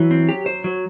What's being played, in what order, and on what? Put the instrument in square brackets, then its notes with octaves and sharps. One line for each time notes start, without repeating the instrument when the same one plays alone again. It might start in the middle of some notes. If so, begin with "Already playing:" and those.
Already playing: [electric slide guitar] E3 [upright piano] F#3
[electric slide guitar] C4
G4
C5
F#3